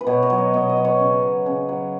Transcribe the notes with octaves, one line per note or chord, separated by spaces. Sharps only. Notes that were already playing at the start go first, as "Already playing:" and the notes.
B4
B2 C#5
D#5
F#3
C#5
B2 D#5
D#5
F#3
C#5
C#3
F#3
C#3
F#3